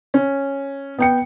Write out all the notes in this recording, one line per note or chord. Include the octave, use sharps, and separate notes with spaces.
C#4
B3 G5 C#7